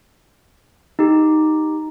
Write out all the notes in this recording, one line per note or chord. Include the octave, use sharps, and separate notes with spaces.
D#4 G4